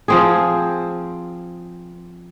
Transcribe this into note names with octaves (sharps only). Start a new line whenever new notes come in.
F3 C4 G#4